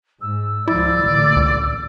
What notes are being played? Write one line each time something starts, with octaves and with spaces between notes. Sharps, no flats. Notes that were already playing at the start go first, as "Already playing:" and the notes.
G#2 E6
C#2 F3 E4 D5
A1 A#2 D3
C#2